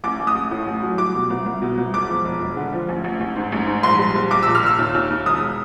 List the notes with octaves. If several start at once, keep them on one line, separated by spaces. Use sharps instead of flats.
A1 D6
A1
D#6
A1
A2
A1
F#3
G3 D6
B2
C2
C2
B2
C2
E1 D6
F3
E1
E1
D3
F3
A1
A1
A1
G#2
A1
G#2
A#1 C6
G3
A#1
A#1 D6
A#2 E6
F6
A#2 E6
D#2
D#2
D#2
E1 D#6